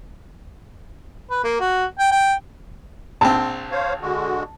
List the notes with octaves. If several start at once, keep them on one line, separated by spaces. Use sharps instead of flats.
B4
A#3
F#4
G5
G5
A#1 C4 A5
C5 C#5 F5
D3 G#3 F#4